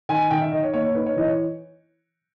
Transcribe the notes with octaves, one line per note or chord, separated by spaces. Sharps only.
D#3 G#5
D#3 G5
E5
D#3 D#5
C#5
A#3 C#5
C#5
D#4 B4
C#5
E3 D#5
C#5